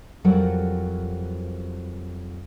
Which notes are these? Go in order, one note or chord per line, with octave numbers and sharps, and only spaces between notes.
F2 F#3 G3 A#4 F#5